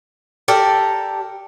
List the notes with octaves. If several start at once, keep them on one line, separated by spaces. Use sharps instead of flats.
G4 A4 A#4 D5